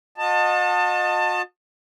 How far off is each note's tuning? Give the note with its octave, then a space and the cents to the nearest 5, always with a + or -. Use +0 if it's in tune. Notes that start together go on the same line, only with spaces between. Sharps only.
F#4 -45 D#5 -10 A5 +20